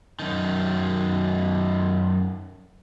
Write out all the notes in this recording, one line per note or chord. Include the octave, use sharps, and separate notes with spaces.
F#2 D#3